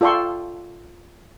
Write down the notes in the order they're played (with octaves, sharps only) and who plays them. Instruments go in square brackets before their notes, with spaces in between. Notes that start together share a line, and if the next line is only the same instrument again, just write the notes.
[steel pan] F4 A4 D5 G5 C6 C#6